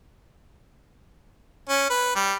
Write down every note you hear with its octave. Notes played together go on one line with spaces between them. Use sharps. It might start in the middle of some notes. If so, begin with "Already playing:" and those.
C#4
B4
G3